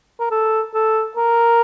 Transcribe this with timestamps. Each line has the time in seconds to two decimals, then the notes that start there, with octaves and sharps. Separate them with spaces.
0.20 A#4
0.31 A4
0.74 A4
1.17 A#4